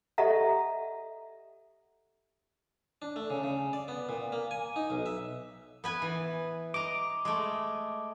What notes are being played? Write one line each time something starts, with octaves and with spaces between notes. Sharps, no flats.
G4 A4 D#5 E5 F#5 A#5
D4
A3
C#3
C#3
D5
B3
A#2
A#3
G#5
D#4
B1
E5
B3 B4 G#5
E3
D#5 A#5 D6
G#3 A3